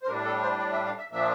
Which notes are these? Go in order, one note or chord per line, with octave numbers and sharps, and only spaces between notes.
C5
A2 G3 D4 A#4
A4
C5
D5
E5
F5
E5
A#2 F3 A#3 D4 E5